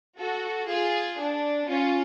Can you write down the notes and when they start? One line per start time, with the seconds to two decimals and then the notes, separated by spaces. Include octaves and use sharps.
0.18 F#4 A4
0.68 F4 G#4
1.19 D4
1.69 C#4 F4